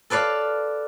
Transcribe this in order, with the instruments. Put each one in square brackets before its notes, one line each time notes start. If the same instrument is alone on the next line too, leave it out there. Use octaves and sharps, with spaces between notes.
[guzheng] A4 B4 D5 F5